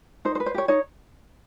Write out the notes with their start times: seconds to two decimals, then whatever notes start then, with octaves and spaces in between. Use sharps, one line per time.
0.25 D#4 C5
0.35 C5
0.40 B4
0.46 C5
0.54 G4 C#5
0.68 D#4 C#5